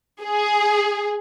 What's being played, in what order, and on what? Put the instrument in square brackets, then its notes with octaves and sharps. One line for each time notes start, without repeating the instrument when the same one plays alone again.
[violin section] G#4